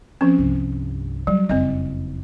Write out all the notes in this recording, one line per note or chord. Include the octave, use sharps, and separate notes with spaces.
F3 C4 C#4
C2 G2
F#3 G3
F#1 F2 C4 D#5